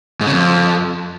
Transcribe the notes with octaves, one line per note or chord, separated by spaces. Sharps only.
G#2
C#3
F2